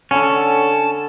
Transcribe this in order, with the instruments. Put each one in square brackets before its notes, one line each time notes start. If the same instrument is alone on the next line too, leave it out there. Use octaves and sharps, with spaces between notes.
[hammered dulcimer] D3 A4 [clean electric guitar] C#4 [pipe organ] A5